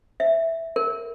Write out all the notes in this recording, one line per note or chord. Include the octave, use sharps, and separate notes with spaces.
E5
A#4